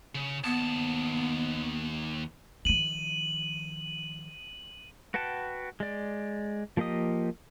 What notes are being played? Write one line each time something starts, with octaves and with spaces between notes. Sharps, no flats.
C#3
D#2 B3 A5
D#3 F3 D#7 F#7
F#4 B4 F#5 G5 A5
G#3 D5
F3 A#3 G4 D#5 D#6